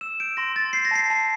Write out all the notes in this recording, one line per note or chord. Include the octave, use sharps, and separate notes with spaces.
E6 E7
G6 D7
C6 A#6
C6 A6
G6 C7
A#6
A5 C7
A5